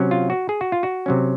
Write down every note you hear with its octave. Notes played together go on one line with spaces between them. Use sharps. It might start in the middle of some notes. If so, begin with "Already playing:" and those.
Already playing: C3 F#3 C#4
F4
F#4
G#4
F#4
F4
F#4
C3 F#3 C#4